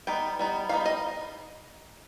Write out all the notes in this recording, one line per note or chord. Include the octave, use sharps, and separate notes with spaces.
G3 B3 D#4 G5
G3 B3 D#4
G3 B3 D#4 F5
D#5